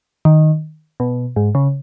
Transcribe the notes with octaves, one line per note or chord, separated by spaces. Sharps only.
D#3
B2
G#2
C#3